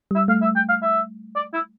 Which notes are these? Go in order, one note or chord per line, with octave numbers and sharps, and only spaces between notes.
G3 E5
A3 F5
E5
G5
F5
E5
D5
E4